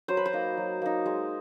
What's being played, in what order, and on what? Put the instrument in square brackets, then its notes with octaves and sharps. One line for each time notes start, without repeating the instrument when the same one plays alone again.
[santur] F#3 C5
B4
C5
A#3 D#4
F#3
A#3 D#4
G#3